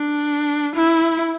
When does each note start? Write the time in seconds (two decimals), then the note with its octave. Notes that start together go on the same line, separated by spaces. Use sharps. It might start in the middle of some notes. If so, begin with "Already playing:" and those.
Already playing: D4
0.75 E4